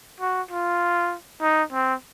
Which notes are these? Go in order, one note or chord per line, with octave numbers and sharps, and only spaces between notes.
F#4
F4
D#4
C4